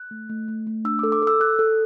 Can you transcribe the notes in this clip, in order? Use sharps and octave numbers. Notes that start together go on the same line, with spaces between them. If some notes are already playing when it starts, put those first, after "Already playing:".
Already playing: F#6
A3
A3
A3
A3
D4 E6
D6
A4
D6
A4 E6
A4 F#6
A4